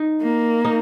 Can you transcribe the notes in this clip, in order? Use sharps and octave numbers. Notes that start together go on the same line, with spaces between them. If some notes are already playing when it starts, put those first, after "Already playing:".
Already playing: D#4
A#3
D#4